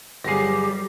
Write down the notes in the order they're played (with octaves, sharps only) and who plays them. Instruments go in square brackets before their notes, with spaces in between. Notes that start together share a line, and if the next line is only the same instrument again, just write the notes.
[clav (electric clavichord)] G1 G#4 [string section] F#3 G3 [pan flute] G4 [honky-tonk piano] A#6 C7